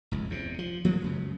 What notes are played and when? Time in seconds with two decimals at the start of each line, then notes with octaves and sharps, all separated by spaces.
0.11 F1 C#2
0.30 E2 C3
0.59 F3
0.85 F3 A3 A#3
1.02 C#2 F#2 C#3